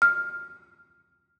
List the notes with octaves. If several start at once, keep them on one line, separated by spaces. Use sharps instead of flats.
F6